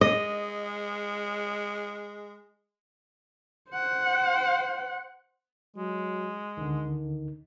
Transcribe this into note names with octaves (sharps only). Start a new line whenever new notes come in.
G#3 D#5
C5 F#5
F#3 G#3
D2 D3 D#3